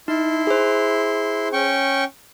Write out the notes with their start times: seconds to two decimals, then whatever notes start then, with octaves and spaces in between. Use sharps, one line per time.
0.08 D#4 E4 C6
0.47 G#4 C5
1.53 C#4 G5 C#6